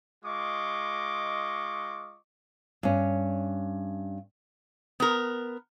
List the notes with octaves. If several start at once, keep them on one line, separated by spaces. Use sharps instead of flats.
G#3 F4 D#5 C#6 D6
G2 C#4
B3 A#4